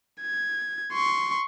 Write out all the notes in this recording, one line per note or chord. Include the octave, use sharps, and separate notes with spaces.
G#6
C6 C#6